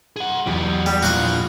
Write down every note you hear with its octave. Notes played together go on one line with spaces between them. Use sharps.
G#4 F#5
E2 F#3 G4
G3
A#2 F3 F#4 F5